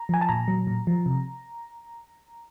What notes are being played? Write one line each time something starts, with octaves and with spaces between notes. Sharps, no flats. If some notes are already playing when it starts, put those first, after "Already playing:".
Already playing: A#5
F3 G#5
A5
A#2 A#5
F#3
A#2
F3
C3